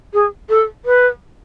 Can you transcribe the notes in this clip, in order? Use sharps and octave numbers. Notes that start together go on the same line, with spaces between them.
G#4
A4
B4